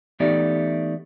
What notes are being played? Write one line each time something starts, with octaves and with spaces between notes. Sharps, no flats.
E3 A3 B3 D#4 G4 D5